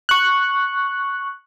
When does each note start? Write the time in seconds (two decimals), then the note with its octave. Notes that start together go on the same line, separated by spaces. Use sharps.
0.09 C#6 F#6